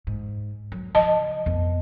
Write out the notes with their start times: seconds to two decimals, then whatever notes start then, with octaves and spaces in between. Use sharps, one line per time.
0.07 G#2
0.72 F#3
0.95 C#3 F3 D#5 A5
1.46 F2 B3